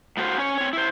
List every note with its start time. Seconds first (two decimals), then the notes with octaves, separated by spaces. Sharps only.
0.17 A2 A3 F#4 C5 F5
0.38 C#4 C#5
0.58 C4 C#5
0.73 E4 C5